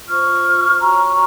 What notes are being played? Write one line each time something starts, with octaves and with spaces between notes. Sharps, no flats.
F4 C5 C#6 F6
F#4 C#5 A#5 C#6